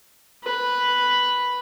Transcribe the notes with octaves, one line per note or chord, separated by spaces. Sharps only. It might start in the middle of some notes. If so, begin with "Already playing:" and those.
B4